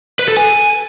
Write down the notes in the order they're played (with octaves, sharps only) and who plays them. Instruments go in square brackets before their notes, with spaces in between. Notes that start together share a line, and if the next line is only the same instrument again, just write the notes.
[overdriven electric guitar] B4
A4
G#5